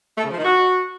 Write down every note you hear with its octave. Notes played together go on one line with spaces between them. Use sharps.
A3
C#3
F3
D#3
F#4